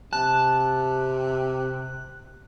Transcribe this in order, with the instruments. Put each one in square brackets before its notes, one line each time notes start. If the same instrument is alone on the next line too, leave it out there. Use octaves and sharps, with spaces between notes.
[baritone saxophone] C3 [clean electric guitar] A5 [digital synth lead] F#6